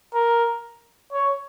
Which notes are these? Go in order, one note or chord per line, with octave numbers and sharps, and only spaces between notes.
A#4
C#5